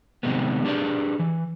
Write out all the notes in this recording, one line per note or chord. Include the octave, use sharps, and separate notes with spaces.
C3 D#3 G3 G#3 B3
D4 G4 G#4 B4 D5
E3